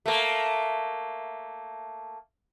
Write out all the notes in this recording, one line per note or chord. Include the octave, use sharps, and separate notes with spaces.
A3 A#3